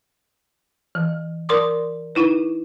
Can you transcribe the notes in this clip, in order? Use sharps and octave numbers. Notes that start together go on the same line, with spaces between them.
E3
A#4 D5 C6 D6 D#6
D#4 E4 B4